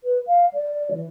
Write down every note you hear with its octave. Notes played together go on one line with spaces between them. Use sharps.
B4
F5
D5
E3